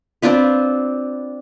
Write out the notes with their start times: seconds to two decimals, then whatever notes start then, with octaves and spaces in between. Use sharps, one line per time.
0.22 C4 D4 F4 B4